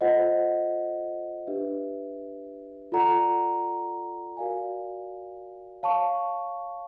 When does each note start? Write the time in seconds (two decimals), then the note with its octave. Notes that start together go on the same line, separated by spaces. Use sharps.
0.01 F4 A4 C5 D#5 F#5
1.47 D4 G4 B4 E5
2.92 F4 A4 D5 F#5 A#5
4.37 F#4 A#4 D5 F5 G#5
5.83 C#5 F5 A5 C#6